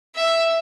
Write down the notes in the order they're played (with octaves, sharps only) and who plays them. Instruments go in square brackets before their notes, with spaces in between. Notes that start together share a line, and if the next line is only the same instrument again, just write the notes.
[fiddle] E5